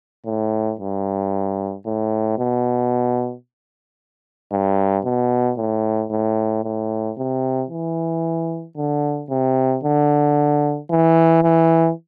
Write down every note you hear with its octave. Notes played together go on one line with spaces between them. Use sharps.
A2
G2
A2
B2
G2
B2
A2
A2
A2
C3
E3
D3
C3
D3
E3
E3